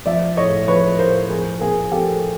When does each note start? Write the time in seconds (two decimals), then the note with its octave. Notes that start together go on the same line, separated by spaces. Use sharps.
0.06 F3 D5 E5
0.37 A2 C#5 D#5
0.68 F3 B4 C#5
0.99 A2 A#4 C5
1.30 F3 G#4 A#4
1.60 A#2 G#4 A#4
1.92 F3 G4 A4